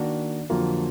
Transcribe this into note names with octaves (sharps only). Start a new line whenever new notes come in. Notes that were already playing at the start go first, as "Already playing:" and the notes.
Already playing: D#3 A#3 D4 F#4
F2 D3 F#3 A#3 F4